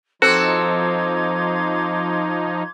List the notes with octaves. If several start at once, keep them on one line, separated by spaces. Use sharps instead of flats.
F3 C4 D#4 F#4 A4 C6 D6 G#6